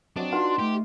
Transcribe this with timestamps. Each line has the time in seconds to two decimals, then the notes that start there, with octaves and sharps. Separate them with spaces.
0.16 F#3 C4 D4 F#4 D#5
0.32 D#4 F4 F#4 B4 F#5 C6
0.59 A3 G4